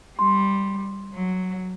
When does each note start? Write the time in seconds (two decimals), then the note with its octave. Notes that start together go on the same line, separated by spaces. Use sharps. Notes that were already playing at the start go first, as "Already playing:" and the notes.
0.19 G3 C6
1.14 F#3